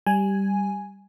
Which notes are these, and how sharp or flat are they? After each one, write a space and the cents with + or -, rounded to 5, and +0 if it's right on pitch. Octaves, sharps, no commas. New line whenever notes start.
G3 +0 G#5 +0